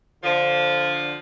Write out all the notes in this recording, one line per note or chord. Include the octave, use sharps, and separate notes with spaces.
D3 F3